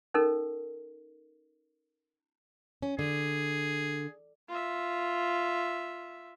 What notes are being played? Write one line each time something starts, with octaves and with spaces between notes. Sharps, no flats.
C#4 D#4 A4 A#4
C#4
D3 G#4
F4 E5